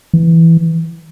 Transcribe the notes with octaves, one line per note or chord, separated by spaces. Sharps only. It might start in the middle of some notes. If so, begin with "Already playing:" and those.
E3